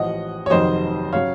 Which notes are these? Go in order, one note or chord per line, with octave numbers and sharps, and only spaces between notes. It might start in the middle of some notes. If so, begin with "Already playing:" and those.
Already playing: A1 A2 F3 D#5 F#5
C#5
F1 F2 D#3 F#3 C5 D#5
C#3 F#3 C#5 F5